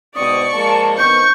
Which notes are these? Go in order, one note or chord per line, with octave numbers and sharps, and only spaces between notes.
G#2 B2 C4 D5 C#6 D#6
F3 G#3 A#3 A5
D#3 B3 C4 C#6 G6